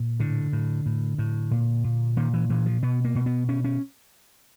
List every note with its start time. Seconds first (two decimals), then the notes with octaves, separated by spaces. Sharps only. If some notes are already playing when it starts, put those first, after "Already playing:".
Already playing: A#2
0.20 A2 D3
0.53 A2
0.86 A2
1.18 A2
1.51 A#2
1.84 A#2
2.17 A#2 D#3
2.34 E3
2.49 A#2 E3
2.66 F3
2.82 B2 B3
3.04 A#3
3.15 B2
3.26 B3
3.48 B2 C#4
3.64 C#4